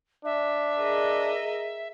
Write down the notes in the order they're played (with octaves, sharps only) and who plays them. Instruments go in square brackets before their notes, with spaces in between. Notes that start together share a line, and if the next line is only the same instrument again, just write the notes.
[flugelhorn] D4 [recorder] E5
[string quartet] G#4 A#4 D#5